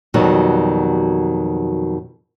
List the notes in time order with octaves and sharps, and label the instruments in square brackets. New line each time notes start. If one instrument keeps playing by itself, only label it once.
[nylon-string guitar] F2 B2 D#3 F#3 G3